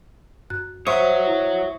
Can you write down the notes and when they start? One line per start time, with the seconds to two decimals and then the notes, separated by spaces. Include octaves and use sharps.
0.50 F#2 F#6
0.87 C5 C#5 E5 F#5 C#6 D#6
1.27 E4